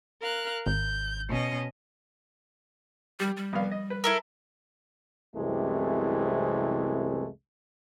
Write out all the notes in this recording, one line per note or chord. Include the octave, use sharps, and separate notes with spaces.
A#4 F5 F#6
G#1 G6
B2 C#4 D#5
G3 G4
G3
C2 B3 F5
D#5
B4
E4 A4 A#4
C2 F#2 C3 E3 G#3 A3